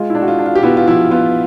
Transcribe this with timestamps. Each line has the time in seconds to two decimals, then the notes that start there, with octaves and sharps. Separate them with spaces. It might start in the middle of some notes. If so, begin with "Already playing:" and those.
Already playing: G#3 F4
0.10 D4 E4
0.22 F#4
0.28 F4
0.39 D4
0.46 F4
0.55 G4
0.63 B3 E4 F#4
0.77 F4
0.87 F3 E4
1.11 B3 F4